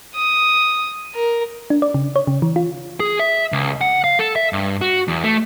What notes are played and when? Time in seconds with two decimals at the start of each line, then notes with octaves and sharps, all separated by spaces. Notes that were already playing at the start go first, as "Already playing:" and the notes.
0.15 D#6
1.15 A#4
1.70 D4
1.82 D5
1.94 C#3
2.16 C#5
2.27 C#3
2.42 E3
2.56 F4
3.00 G#4
3.19 E5
3.52 C#2
3.81 F#5
4.04 F5
4.19 A4
4.36 E5
4.53 G2
4.81 F#4
5.08 E2
5.23 A3